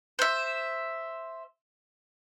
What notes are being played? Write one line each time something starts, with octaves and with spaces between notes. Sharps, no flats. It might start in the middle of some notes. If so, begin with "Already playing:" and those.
C5 E5